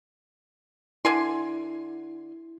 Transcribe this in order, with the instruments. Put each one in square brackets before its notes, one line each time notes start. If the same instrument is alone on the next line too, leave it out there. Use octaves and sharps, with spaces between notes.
[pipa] D3 G#5 C6 [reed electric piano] E4